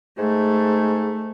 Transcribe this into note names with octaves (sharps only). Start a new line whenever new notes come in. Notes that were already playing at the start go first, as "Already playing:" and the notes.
G#2 A3